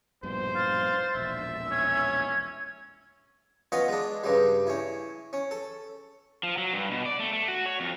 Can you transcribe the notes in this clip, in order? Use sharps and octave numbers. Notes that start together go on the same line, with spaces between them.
A#1 G2 B2 C5
F5 A6
E1 A#1 E5
C#4 G#6
B3 C#4 F4 D#5 B5
G#3 D4
G2 C#3 G3
C#4 E4
C#4
A4
F3
F#3
G2
B2
D5
A3
A3
F#4
C#5
F2